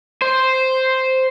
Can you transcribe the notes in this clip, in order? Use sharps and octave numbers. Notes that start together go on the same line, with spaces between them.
C5